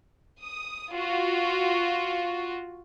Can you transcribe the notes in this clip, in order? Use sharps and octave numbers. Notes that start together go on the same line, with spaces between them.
D#6
F4 F#4